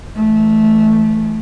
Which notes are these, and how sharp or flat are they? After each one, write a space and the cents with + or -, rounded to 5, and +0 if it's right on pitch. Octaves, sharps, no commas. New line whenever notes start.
E3 +0 A3 -15